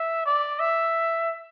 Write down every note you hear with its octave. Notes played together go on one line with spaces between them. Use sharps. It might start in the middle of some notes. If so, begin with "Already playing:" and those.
Already playing: E5
D5
E5